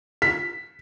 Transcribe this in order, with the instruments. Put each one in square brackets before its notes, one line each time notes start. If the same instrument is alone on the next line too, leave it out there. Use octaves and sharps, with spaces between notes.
[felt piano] B6